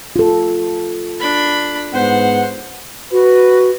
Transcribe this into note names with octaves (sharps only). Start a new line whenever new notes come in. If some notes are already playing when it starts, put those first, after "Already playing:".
F4 A4
D4 B5
G#2 B3 C5 F#5
F#4 B4